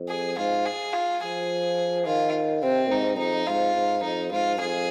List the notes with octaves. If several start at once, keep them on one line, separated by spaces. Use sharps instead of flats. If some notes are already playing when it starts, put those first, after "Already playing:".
Already playing: F2
G#4
G#2 F4
G#4
F4
F3 G#4
D#3 F4
C3 C4
G#2 D#4
F2 D#4
G#2 F4
G#2
F2 D#4
G#2 F4
F2 G#4